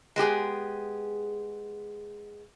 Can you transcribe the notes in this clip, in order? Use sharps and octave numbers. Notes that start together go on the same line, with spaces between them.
G#3 B3 G4 G#4